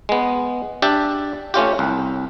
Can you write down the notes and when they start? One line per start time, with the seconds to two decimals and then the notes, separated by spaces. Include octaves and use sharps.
0.09 G#3 B3
0.82 D4 G4 E5 A5
1.54 A3 C#4 F4 G4
1.79 C2